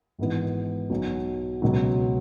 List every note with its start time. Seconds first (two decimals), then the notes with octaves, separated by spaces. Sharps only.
0.18 G#1 G#2 E3 B3
0.90 B1 B2 F#3
1.62 C#2 B2 F#3